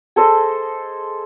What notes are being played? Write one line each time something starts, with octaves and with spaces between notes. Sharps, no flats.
G#4 A4 C5 D#5